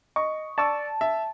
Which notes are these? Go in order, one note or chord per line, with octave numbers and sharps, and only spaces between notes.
D#5 C#6
D5 A5 C#6 E6
E5